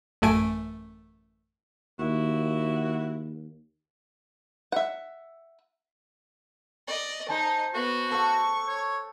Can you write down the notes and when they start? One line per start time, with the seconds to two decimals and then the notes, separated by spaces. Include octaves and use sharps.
0.22 A1 F#2 A3 G#5 D7
2.00 D#2 E4 F#4
4.72 E5 F#5
6.87 D5 D#5
7.28 D#4 C5 G#5 A5
7.74 B3 F#4
8.11 A4 F#5 C#6
8.67 C#5